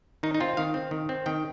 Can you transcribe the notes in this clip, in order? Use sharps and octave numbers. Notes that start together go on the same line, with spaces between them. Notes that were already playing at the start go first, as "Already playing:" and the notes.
D#3 D#4
D#4
C4 F4
D#3 F5
C4
D#3
C4
D#3 G5